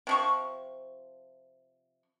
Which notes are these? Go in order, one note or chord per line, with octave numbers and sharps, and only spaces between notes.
C3 F3 C#6